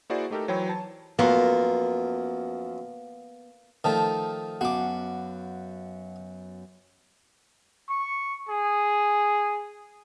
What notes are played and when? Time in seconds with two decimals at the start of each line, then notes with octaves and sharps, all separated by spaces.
0.10 A#3 E4 F#4 G#4 C5 D5
0.30 A3 D#4 G4 A4 A#4
0.48 E3 F#3 C5 C#5 G5 B5
0.69 A5
1.19 F#2 F3 A#3 B3
3.84 D#3 F3 A3 A5
4.61 F#2 B3 F#4 F5 D6
7.89 C#6
8.49 G#4